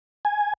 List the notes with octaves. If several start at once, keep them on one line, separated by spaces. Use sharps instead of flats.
G#5